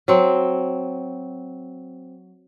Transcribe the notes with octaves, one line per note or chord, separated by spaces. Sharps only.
F#3 C4